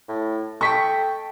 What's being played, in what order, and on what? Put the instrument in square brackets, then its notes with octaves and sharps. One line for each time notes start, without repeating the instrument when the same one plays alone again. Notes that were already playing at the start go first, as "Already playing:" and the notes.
[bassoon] A2
[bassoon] A4 [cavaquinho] D#5 G5 [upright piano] C#6 B6